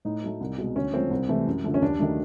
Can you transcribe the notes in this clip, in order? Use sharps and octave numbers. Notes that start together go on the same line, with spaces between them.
A2 D#4
F#3 A3
C2
B2 G#3
D2 C#4
C#3 F3 A3 C4
C2
C3 E3 A3
F#2
D3 F3 A3
C#4
D#2 D4
D#3 F#3 A3